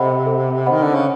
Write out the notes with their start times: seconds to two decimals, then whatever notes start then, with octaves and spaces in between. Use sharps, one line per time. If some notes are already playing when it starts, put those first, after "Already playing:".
Already playing: C3 A4 C5 D#5 F#5 B5
0.26 A4
0.66 D#3 C5 D#5 F#5 B5
0.82 D3
0.95 C#3